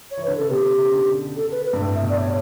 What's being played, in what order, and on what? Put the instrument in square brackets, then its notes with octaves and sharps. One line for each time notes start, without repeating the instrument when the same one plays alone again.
[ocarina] C#5
[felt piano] E3
[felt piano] D3 [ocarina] B4
[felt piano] C#3 [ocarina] A4
[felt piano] B2 [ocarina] G4
[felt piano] C#3
D3
[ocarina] A4
B4
B4
[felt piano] G2
A2
[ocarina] E5
[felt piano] B2
[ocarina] D5
C#5